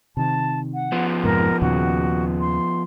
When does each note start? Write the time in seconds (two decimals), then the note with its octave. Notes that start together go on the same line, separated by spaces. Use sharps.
0.17 C3 D#3 A5
0.74 F#5
0.92 F3 B3
1.23 F2 G#2 C3 A#4
1.62 D#2 A#2 C#3 F#4
2.40 C6